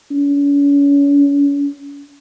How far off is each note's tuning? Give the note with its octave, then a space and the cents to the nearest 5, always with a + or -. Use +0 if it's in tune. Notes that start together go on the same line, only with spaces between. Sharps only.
C#4 +40